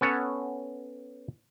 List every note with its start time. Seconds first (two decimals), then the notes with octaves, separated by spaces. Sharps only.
0.01 B3 C#4 A4 C#5 F#5